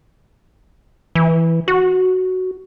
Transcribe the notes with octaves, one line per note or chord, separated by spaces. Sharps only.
E3
F#4